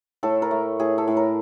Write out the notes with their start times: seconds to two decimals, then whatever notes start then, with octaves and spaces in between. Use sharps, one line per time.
0.23 A2 A4
0.42 A#4
0.51 A3
0.79 A2 G#4
0.98 A4
1.08 A2
1.17 A#4